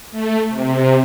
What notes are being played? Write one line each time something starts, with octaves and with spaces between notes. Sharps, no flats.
A3
C3